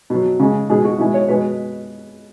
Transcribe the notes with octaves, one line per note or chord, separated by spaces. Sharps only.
B2 F#3
C#3 G#3
B2 G#3 G#4
F#4
B2 G#3 E4
C#5
B2 G#3 B4